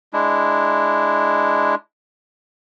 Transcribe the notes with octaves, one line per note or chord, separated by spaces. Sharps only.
G#3 D4 E4